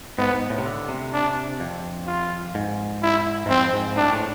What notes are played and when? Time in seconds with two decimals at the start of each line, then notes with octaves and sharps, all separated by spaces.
0.18 G#2 B3
0.34 G#2
0.50 A2
0.58 C3
0.66 D3
0.89 C3
1.13 D4
1.60 F2
2.07 F4
2.55 G#2
3.03 E4
3.46 G#2
3.49 F2 C4
3.73 G#2
3.96 A2 D4
4.13 A2